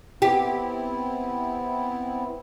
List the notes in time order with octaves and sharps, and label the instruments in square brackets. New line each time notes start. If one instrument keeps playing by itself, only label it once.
[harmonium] B3 C4 E4 [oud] G4